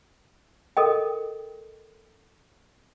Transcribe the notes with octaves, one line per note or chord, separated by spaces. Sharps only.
A4 A#4 D#5 G5